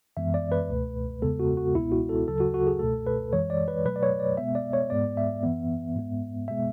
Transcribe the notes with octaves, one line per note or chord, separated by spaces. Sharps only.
F#2 E3 G#3 B3 E5
D5
B4
C#2 B2 A3
E2 C#3 G#3 B3 A4
F#4
F#4
C#2 B2 G#3 B3 E4
F#4
A4
D2 C#3 F#3 A4
F#4
F#4
G#4
C#2 B2 A3 A4
B4
F#2 E3 G#3 C#5
D5
B4
B2 F#3 A3 B4
D5
C#5
D5
B2 G#3 B3 E5
D5
C#5
G#2 G#3 B3 D5
E5
F#2 E3 B3
G#2 G#3 B3
B2 G#3 B3 E5